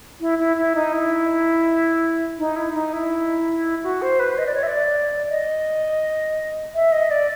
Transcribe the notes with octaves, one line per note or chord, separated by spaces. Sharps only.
E4
E4
E4
D#4
E4
D#4
E4
D#4
E4
F#4
C5
B4
D#5
D5
C#5
E5
D5
D#5
E5
D#5
D5